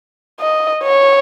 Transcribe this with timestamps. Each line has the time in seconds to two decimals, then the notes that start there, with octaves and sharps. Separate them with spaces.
0.40 D#5
0.83 C#5